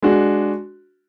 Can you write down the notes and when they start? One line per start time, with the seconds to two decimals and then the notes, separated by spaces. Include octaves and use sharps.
0.02 G#3 D4 F#4